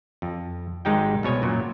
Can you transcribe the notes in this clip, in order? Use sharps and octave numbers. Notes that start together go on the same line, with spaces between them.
F2
G#1 G#2 G#3 D#4 G4 G5
C2 B2 C#5 G#5
F#2 A#2 F#3